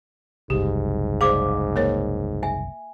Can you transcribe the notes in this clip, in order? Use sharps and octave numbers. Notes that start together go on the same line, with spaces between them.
F#1 C2 G#2 G4
G#4 C5 D5 F5 D6
A#3 A#4 C#5
E5 G#5